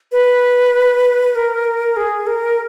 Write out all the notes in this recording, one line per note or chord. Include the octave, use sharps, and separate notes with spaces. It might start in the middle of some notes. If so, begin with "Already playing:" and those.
B4
A#4
G#4
A#4